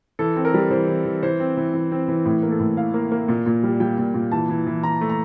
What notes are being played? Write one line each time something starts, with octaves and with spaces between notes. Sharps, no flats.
E3 A4
C4
A#4
G3
E3 C5
E3
E3
E3 C5
C4
E3
E3
C4
E3
A2
A#3
A4
A2
E3 F5
A#3
A#3
A#2
A#2
G3
G3 G5
A#2
A#2
E3 A5
E3
E3
E3 A#5
A3
A#5